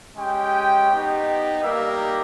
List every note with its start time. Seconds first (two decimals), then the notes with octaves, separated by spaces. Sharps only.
0.16 G#3 C#4 G4 G5
0.89 B3 D#4 G4
1.62 G3 A#3 D#4 G4 E5